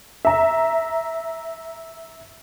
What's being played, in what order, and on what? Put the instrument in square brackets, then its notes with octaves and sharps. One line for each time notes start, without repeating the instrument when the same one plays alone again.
[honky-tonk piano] E5 A#5